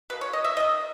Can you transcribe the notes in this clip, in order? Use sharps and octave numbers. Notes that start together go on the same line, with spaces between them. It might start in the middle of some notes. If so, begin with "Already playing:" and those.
B2 A#3 B4
C#5
D#5
E5
D#3 A#3 D#5